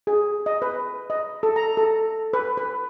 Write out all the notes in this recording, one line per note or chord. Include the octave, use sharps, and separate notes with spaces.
G#4
D#5
B4
D#5
A4
A#5
A4
B4
B4